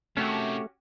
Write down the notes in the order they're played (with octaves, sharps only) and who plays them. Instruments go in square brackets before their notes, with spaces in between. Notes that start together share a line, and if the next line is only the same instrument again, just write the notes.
[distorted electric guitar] C3 D#3 [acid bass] A3 [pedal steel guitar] C#4 F#4 G4